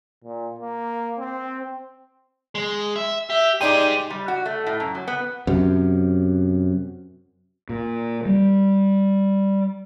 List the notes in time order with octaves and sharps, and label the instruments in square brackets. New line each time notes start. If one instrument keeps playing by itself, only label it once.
[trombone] A#2
A#3
C4
[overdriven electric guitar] G#3
E5
[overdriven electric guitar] G4 [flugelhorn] E5
[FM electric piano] D#4 D5 G5 [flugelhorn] G4 [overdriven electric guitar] G#4 C5 [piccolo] D#7
[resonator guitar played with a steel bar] G3
F#4
A3
A2
F#2
F#3
B3
[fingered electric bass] F#2 C3
A#2
G3